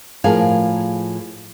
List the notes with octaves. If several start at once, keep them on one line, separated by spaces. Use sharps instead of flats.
A2 F3 G#4 A#4 F5 G#5